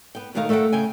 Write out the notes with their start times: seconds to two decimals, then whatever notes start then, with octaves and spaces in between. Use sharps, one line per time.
0.15 B3 G5
0.35 B2 D#3 A3 D#4 A#4 F5
0.49 A3 A4 A#4 E5 F#5 G5
0.73 C#3 G5 G#5